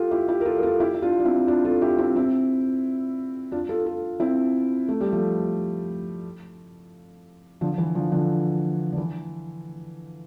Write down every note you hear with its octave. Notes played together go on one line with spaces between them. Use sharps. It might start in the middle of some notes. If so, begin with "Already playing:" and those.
Already playing: F4 G4 A4
E4 G4
E4 G4
A#4
F4 A4
A#4
F4 A4
E4 G4
E4
D4 F4
D4
C4 E4
D4 F4
F4 A4
E4 G4
C4 E4
C4 E4
D4 F4
F4 A4
F4 A4
C4 E4
A3
G3
F3 A3
D3 F3
E3
D3 F3
D3 F3
D3
E3